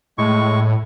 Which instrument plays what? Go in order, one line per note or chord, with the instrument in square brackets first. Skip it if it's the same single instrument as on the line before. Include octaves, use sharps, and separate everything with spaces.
[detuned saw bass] A2 [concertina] G#3 C#6